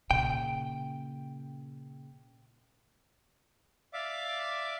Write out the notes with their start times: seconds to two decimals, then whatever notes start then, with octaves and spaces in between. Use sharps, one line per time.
0.11 A#2 C#3 G5
3.93 D5 E5 F5 D6